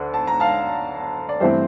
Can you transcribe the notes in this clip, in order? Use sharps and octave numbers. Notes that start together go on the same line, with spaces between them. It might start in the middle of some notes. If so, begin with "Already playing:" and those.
Already playing: D2 D3
A5
A#5
F5 A5
D5
G2 E3 A3 C4 C5 E5